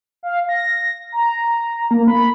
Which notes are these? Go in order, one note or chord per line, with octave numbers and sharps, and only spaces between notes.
F5
A#6
A#5
A#3
B5